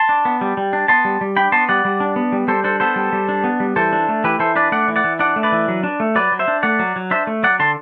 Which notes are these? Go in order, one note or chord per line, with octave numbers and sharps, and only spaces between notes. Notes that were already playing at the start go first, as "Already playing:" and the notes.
Already playing: A5 C6
D4
B3
G3
G3
D4
B3 A5 C6
G3
G3
D4 G5 B5
B3 A5 C6
G3 D5 F#5
G3
D4
B3
G3
G3 A4 C5
D4 A4 C5
B3 A4 C5
G3
G3
D4
B3
G3
E3 A4 C5
D4
A3
E3 G4 B4
E3 A4 C5
D4 B4 D5
A3 D5 F#5
E3
D5 F#5
E3
D4 D5 F#5
A3
B4 D5
E3
F#3
D4
A3
F#3 B4 D5
F#3
C5 E5
D4
A3 D5 F#5
F#3
F#3
D4 C5 E5
A3
F#3 D5 F#5
D3 A5 C6